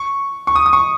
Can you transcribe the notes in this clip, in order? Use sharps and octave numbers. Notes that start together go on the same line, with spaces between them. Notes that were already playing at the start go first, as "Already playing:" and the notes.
Already playing: C#6
C#6
D#6
D#6
C#6